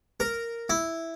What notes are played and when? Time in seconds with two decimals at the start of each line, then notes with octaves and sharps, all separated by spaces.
0.20 A#4
0.70 E4